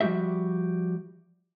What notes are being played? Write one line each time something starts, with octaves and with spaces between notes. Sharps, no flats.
F3 G3 G#3 F#4 G4 E5